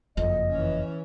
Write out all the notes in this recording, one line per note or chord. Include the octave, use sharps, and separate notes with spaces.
F#1 F2 D#5
E3 C#4